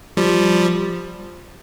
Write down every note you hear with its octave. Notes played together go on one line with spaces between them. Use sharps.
F3 G3